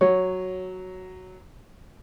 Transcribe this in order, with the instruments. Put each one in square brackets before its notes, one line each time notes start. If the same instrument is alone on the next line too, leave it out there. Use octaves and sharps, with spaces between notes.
[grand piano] F#3 [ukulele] C#5